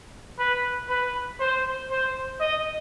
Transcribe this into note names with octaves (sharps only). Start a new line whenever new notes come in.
B4
B4
C5
C5
D#5